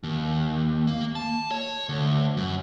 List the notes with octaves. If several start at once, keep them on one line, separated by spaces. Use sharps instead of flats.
D#2
A#3
A5
C#5
D2
F#2